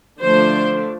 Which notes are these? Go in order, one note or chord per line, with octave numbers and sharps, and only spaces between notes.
D3 F3 A3 D4 C5